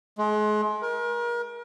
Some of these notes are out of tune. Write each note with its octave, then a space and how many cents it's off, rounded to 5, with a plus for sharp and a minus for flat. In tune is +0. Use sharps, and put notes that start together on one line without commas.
G#3 +35
A#4 +35